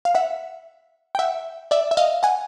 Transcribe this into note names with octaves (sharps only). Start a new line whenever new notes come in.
F5
E5 F#5
G5
E5 F#5
D5 E5
E5
D#5 F5
F#5 G#5